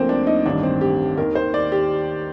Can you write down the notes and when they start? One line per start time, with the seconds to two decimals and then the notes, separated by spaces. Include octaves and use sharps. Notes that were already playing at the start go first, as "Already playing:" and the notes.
Already playing: D2 D3 F3 A#3 C4
0.09 D4
0.27 D#4
0.46 A1 G2 D#3 D4
0.63 C4
0.81 G4
1.17 D#2 D#3 A#4
1.35 C5
1.54 D5
1.72 G4